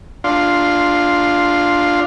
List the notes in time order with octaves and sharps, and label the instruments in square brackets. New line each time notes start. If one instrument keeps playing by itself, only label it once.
[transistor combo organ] D4 F4 F5 C6